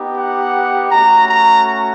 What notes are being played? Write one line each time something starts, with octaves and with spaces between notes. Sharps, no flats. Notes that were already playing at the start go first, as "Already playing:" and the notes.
Already playing: B3 D#4 G4
F#5
A3 C#4 F#4 A#5
A#5